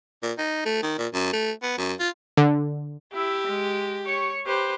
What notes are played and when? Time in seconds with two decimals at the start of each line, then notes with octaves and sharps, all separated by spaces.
0.23 A#2
0.38 D#4
0.66 A3
0.83 D#3
0.98 A#2
1.13 F#2
1.33 A3
1.63 B3
1.78 F#2
1.99 F4
2.37 D3
3.14 E4 G4 E5
3.47 G#3
4.06 C#5 C#6
4.47 G4 B4 C5